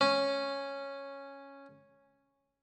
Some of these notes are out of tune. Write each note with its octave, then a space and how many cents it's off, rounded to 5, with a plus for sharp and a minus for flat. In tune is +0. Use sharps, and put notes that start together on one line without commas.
C#4 -5